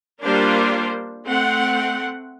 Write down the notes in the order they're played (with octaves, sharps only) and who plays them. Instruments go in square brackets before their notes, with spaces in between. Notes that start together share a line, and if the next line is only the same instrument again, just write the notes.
[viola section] G3 A#3 D4 F4 A#4 C5
A3 C4 F#5